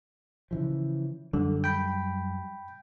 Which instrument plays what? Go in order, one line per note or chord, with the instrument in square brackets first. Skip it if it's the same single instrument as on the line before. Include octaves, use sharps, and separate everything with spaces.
[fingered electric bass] C#3 E3 F3
[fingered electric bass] F#2 G3 [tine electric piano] D3
[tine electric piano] G5 B5